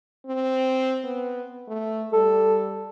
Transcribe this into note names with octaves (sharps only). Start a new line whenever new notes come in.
C4
B3
A3
G3 A4